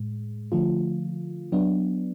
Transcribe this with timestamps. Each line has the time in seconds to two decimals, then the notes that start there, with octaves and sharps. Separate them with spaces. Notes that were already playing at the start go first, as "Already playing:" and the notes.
Already playing: A2 G#3
0.52 D3 F3 A3 F4
1.52 F#3 B3 D4